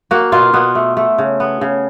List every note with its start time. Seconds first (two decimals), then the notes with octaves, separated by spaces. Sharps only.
0.11 A#3 F#4
0.32 B2 F4
0.53 B2 B3
0.75 A3
0.97 A3
1.18 C#3
1.40 B3
1.61 C#3